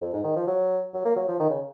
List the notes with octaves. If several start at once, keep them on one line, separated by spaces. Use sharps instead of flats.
F2
G#2
D#3
F3
F#3
F#3
A#3
F#3
F3
D#3
C#3